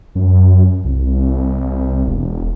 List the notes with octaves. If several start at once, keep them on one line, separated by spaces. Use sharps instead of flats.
F#2
C2
E1